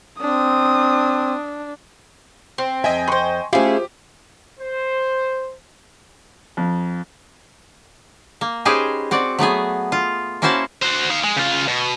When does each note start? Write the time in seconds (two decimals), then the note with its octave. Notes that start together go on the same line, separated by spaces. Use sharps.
0.21 C4 D4 D#6
2.58 C4
2.84 F2 D#5 E5 G5 G#5
3.08 B4 C5 C6 C#6
3.53 A3 C#4 E4 F4 G4 G#4 C5 F5
4.60 C5
6.57 F2
8.41 A#3
8.65 C#4 D#4 G4 G#4 B4 C5
9.11 C4 F#4 D5
9.39 F#3 A3 B3 G#4
9.92 F4
10.42 A#3 C#4 E4 F#4 C5 A5
10.83 F#4 C5
11.10 D#4 F5
11.24 G#3
11.37 C#3 F4
11.68 B2